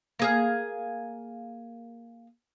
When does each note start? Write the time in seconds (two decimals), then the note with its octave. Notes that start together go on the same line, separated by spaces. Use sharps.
0.19 A#3 G#4 F5